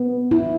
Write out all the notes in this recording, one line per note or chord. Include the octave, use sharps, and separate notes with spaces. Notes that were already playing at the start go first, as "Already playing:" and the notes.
Already playing: B3
E4